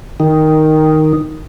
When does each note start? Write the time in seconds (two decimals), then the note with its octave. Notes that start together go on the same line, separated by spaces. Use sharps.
0.20 D#3